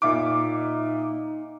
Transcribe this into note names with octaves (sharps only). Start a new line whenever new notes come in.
A#2 D#4 E5 D6